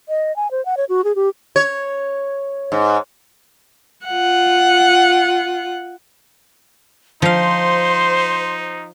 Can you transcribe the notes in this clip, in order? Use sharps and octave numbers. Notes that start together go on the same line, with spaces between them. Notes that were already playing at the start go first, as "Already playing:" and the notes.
D#5
G#5
C5
F#5
C#5
F#4
G#4
G4
C#5
G#2
F4 F#5
F3 D#4 C5 F5 C6